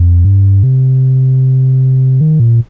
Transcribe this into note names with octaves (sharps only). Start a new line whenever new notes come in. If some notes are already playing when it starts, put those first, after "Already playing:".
Already playing: F2
G2
C3
D#3
A#2